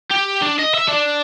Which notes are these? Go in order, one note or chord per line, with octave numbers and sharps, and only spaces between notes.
G4
D4
D#5
E5
D4